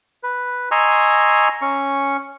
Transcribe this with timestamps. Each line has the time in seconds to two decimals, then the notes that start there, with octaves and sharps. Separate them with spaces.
0.23 B4
0.71 D#5 G#5 A#5 C6 C#6 E6
1.62 C#4 C#6